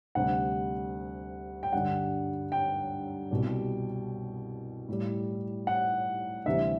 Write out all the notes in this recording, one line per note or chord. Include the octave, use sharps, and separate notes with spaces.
D2 C3 G3 F#5
G5
G2 D3 G3 F#5
G5
C2 B2 G3
A2 G3
F#5
D2 C3 E3 G3 E5